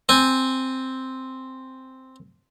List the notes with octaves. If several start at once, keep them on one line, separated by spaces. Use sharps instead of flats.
C4 G#5